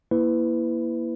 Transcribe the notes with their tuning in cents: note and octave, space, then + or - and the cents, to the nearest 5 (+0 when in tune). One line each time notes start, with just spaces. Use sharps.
A#3 +25 E4 +0 B4 +20